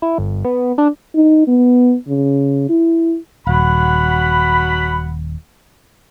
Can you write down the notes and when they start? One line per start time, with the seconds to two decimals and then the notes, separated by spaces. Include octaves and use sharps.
0.02 E4
0.18 G1
0.45 B3
0.78 D4
1.15 D#4
1.47 B3
2.08 C#3
2.69 E4
3.47 D#1 F#3 F#5 B5